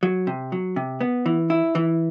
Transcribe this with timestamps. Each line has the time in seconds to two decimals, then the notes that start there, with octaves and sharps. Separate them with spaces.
0.03 F#3
0.27 C3
0.52 F#3
0.76 C3
1.01 B3
1.26 E3
1.50 E4
1.75 E3